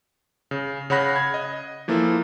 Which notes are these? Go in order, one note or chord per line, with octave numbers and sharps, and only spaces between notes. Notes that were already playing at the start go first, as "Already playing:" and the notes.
C#3
C#3 C#5 F#5 B5 F#6 A#6
G#6
D#5
E3 F3 A#3 E4 A4